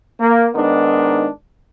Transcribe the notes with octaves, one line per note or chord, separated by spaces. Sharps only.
A#3
G#2 D#3 B3 D4